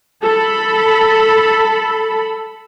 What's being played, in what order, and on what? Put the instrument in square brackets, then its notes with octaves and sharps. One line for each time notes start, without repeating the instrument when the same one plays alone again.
[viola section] A4 B5